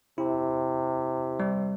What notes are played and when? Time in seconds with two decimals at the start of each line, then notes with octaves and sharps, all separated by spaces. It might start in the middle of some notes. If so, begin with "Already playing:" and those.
0.18 C3 E4
1.40 G3